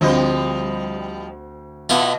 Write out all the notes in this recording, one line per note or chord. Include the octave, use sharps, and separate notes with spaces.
D2 F3 G3 C4 D#5
B2 B3 E4 F4